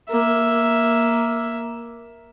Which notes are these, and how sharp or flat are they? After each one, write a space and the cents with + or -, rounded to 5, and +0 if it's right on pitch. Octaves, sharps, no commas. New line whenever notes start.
A#3 +10 E5 +0